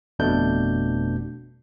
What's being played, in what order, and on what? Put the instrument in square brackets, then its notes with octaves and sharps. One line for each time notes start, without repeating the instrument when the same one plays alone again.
[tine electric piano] G1 F2 B2 A3 D4 G6